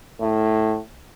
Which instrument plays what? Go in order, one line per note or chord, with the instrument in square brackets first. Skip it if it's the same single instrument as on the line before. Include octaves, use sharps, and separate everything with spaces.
[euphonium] A2